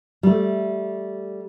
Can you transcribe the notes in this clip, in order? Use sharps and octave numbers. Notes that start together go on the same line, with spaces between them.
G3 A3